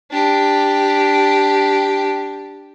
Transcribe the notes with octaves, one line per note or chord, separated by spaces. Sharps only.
D4 G4